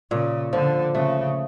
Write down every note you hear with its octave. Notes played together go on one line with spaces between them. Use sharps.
A#2 C#3
D3 F3
C#3 A3